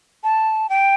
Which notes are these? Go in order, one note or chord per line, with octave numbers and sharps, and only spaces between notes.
A5
G5